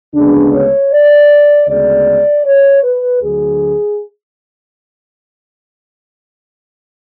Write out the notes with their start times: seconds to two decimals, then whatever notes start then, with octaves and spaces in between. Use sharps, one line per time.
0.14 D2 C#3 G#3 B3 D4
0.53 C#5
0.92 D5
1.68 D2 C#3 G#3 B3 D5
2.44 C#5
2.83 B4
3.21 D2 D3 F#3 G#4